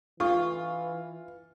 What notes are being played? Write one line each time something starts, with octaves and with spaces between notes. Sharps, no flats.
E3 D4 F4 A4 C#6